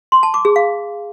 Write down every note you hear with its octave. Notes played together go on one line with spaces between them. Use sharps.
C6
A5
D6
G#4
F5